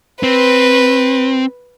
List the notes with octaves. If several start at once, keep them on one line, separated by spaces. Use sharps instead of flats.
C4 B4